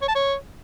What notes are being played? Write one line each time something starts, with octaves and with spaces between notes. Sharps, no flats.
C#5
A5
C#5